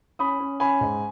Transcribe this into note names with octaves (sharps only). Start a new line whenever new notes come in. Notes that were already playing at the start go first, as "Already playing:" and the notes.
C#4 B5 D#6
C#4
C#4 G#5 B5
G#2